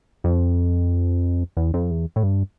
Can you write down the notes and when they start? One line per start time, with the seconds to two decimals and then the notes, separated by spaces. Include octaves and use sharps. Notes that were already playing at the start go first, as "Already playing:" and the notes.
0.24 F2
1.57 E2
1.74 F2
1.91 E2
2.16 A2
2.23 G2